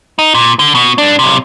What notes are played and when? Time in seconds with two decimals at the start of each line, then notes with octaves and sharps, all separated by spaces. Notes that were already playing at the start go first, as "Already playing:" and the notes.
0.19 D#4
0.34 A#2
0.59 D3
0.75 B2
0.98 G2 D4
1.19 B1 C3